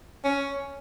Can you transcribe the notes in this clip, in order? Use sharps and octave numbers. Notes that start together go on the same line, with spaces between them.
C#4